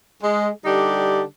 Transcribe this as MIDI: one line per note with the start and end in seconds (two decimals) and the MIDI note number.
0.22 0.50 56
0.65 1.23 50
0.65 1.23 55
0.65 1.23 62
0.65 1.23 63
0.65 1.23 67